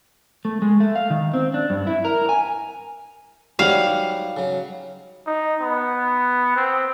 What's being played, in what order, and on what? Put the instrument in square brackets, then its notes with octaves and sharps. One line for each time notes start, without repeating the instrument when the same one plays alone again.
[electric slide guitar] A3
G#3
A3
F5
D#3
C4
D4
G2
E4
A#4
G#5
[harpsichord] G#2 F#3 G#5 [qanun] G3 F#5 [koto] F5
[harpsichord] C#3 F#3
[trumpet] D#4
B3
C4